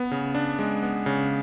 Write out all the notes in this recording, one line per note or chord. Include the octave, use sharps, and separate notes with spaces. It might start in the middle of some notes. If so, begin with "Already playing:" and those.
Already playing: B3
C#3
D4
G#3
B3
C#3